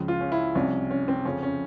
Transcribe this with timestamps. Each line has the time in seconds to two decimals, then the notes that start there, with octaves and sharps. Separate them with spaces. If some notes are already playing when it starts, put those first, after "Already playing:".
Already playing: C#2 C#3 F3
0.08 F4
0.21 C#4
0.32 E4
0.55 C2 C3 F3 C#4
0.90 C#4
1.08 C4
1.25 F2 C#3 F3 C#4
1.43 C#4